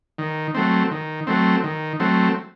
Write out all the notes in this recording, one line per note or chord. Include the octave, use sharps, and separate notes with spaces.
D#3
F#3 A3 C4
D#3
F#3 A3 C4
D#3
F#3 A3 C4